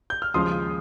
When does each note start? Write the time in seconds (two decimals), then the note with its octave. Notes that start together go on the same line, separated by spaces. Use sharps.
0.10 G6
0.22 F6
0.34 D#2 C#3 F3 G#3 C6 D#6